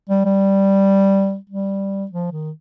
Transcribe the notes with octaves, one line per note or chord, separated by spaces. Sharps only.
G3
G3
G3
F3
D#3